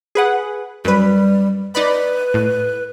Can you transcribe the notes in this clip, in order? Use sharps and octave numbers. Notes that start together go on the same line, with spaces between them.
G#4 B4 F#5
F#2 G3 B4
D#4 B4 D5 B5
A2